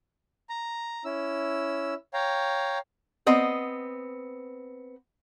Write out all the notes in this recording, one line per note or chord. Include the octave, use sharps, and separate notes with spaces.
A#5
C#4 E4 E6
C#5 F5 G5 A#5
B3 C4 D#5